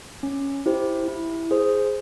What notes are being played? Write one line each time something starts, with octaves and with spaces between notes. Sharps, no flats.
C#4
E4 G4 C5
E4
G#4 C5